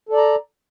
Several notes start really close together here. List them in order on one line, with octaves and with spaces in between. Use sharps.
A4 D5 A#5